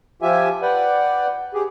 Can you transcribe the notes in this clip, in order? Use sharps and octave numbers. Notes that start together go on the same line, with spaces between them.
F3 F4 G4 E5 G#5
B4 D5 F#5 G5
G4 G#4